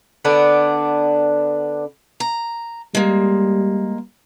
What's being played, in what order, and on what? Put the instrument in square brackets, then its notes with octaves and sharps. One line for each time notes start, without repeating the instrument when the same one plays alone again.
[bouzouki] D3 B3 D4
[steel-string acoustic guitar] A#5
[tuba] G3 [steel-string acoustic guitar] G#3 A#3